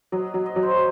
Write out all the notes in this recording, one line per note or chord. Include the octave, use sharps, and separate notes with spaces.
F#3 D#5
F#3
D#5
F#3
C5
C#5